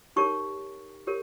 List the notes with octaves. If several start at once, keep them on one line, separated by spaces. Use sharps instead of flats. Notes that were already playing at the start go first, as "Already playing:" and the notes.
D#4 G4 A#4 C#5 C#6
G4 A#4 C#5